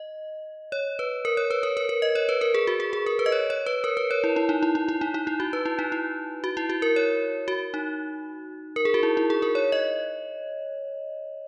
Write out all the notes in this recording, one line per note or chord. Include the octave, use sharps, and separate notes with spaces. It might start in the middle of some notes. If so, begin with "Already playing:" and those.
Already playing: D#5
C#5
B4
A#4
C#5
B4
A#4
A#4
A#4
D#5
C#5
B4
A#4
G#4
F#4
G#4
G#4
A#4
B4
D#5
C#5
C#5
B4
A#4
B4
C#5
E4
E4
D#4
E4
E4
E4
D#4
D#4
E4
F#4
B4
E4
D#4
E4
F#4
E4
F#4
A#4
C#5
F#4
D#4
A#4
G#4
F#4
E4
E4
G#4
A#4
C#5
D#5